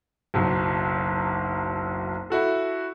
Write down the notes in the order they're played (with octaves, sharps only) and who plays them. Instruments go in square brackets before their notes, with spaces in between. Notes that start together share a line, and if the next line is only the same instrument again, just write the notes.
[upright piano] F#1 B1 F#3
E4 F#4 A4